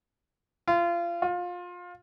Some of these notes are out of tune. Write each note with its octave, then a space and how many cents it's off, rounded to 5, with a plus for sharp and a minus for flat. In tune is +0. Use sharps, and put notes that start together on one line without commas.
F4 -25
F4 +25